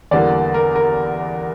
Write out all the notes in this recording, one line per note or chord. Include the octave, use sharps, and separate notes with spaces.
E2 D3 G3 A#3 D5
A#4
A#4